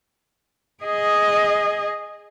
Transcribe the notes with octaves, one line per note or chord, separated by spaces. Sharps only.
G#4 D#5